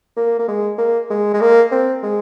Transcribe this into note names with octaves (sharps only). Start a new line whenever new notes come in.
A#3
A#3
G#3
A#3
G#3
G#3
A#3
C4
G#3